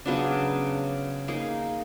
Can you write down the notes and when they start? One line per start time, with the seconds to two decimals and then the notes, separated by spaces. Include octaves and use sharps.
0.06 C#3 F#3 B3 D4
1.28 A#3 D#4 G#4